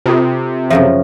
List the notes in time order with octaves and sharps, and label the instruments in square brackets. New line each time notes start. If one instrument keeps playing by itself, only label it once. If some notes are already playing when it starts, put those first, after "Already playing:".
[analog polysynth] C3 [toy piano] F4 A4
[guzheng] F#2 C#3 F3 [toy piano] E5